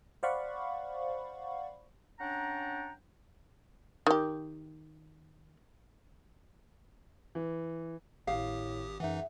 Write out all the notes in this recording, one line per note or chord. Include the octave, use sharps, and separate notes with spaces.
C5 D5 F5 F#5 B5 C#6
C#4 D4 F#5 G5 A#5
D#3 G4
E3
G#1 A2 G4 F5 D#6
F#2 E3 D#4 G#4 E5 F#5